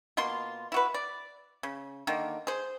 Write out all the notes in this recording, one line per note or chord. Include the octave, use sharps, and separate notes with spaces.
B2 A#3 F4 C6
E4 F#4 B4
D5
C#3
D3 D#3 A#3
G#4 C5